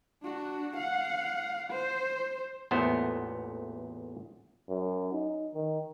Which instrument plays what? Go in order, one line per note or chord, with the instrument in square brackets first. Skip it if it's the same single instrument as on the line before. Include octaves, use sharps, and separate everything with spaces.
[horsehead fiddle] D4 F#4
F5 F#5
C5
[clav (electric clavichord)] A1 E2 A#2 A3 B3 C5
[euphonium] F#2
D#4
D#3